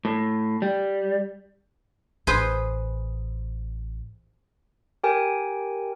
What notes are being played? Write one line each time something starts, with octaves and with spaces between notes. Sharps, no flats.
A2
G3
A1 G#4 B4 C5
G4 A#4 G5 G#5